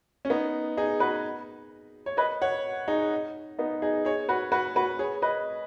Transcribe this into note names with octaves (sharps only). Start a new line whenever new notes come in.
C#4
B3 D#4
D#4 G#4
F#4 B4
C#5
B4 D#5
C#5 F#5
D#4 G#4
B3 D#4
D#4 G#4
G#4 C#5
F#4 B4
F#4 B4
F#4 B4
G#4 C#5
B4 D#5